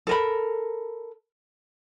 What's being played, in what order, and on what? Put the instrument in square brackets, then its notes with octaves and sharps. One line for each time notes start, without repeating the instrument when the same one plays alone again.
[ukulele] A4 A#4 B5